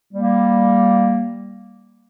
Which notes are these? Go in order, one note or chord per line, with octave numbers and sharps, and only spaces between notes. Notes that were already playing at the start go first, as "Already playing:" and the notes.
G3 A#3